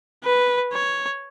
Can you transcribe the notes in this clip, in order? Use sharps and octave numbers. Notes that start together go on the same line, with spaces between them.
B4
C#5